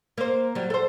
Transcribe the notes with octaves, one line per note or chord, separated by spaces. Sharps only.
A#3 C5
F#3 G3
A4 C5